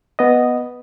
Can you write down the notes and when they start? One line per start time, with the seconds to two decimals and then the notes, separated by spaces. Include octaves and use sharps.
0.19 B3 D#5